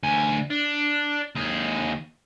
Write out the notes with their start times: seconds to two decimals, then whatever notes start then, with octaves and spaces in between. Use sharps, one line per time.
0.03 D2 G#5
0.50 D4
1.35 D#2 G#4